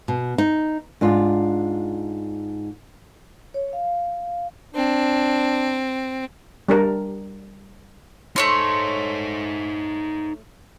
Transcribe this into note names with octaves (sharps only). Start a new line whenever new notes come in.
B2
D#4
G#2 D4 F4
C#5
F5
C4 D4
G3 D4 A#4
A3 D#4 C5 C#5 C6